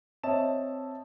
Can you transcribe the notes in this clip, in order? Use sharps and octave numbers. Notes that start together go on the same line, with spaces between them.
C4 C#5 D#5 E5 A5 E7